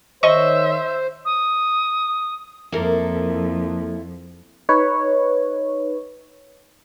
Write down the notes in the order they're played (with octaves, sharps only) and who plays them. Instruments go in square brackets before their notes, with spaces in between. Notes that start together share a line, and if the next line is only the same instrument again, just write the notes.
[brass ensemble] D#3 C#5 [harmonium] C5 [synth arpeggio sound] D#5 C#6 [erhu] E5
[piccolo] D#6
[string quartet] F2 [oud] A#3 A#4 [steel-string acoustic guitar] E4 A4
[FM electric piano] D#4 B4 C#5